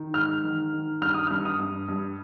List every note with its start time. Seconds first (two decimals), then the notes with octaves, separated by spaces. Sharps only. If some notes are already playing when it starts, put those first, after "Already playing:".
Already playing: D#3
0.14 G#2 F6
0.44 D#3
0.73 D#3
1.01 G2 F6
1.14 D#6
1.27 G2 F6
1.45 D#6
1.59 G2
1.88 G2